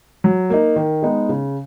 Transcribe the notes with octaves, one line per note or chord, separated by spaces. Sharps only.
F#3
A#3 D#4
D#3
G#3 B3 D#4
C#3